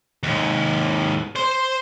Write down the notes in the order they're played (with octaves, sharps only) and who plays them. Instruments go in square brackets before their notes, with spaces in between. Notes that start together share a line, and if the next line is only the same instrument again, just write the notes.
[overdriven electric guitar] D#2 G#2
C5 C6